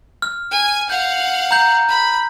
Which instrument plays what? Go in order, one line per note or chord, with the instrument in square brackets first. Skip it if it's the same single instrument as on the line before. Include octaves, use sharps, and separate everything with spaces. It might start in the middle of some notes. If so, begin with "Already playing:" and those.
[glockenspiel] F6
[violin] G#5
[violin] F5 F#5 [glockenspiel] G6
[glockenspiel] A#5 G6
[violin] B5